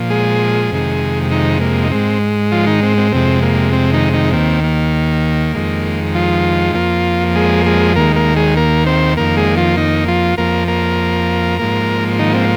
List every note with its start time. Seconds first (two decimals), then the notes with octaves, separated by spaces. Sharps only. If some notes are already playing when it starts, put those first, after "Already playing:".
Already playing: A#2 F3
0.10 G#3 G#4
0.71 F2 C3 D#3 G#3
1.31 D#3 D#4
1.61 A#3
1.84 D#4
1.91 G#2 G#3 C4
2.52 F3 F4
2.67 D#3 D#4
2.83 C4
2.98 C4
3.12 F2 C3 G#3 C4
3.42 A#3
3.73 C4
3.93 D#3 D#4
4.13 D#3 D#4
4.33 D#2 D#3 A#3 C4
4.64 A#3
5.55 F2 D#3 G#3
6.15 F3 F4
6.75 F2 F3 A#3
7.36 G#3 G#4
7.66 G#3 G#4
7.96 D#2 D#3 G#3 A#3 A#4
8.16 A#3 A#4
8.36 G#3 G#4
8.57 A#3 A#4
8.86 C4 C5
9.17 F2 D#3 A#3 A#4
9.37 G#3 G#4
9.57 F3 F4
9.77 D#3 D#4
10.08 F3 F4
10.38 F2 F3 A#3 A#4
10.68 A#3 A#4
11.59 G#2 F3 A#3
12.19 D#3 D#4
12.34 C4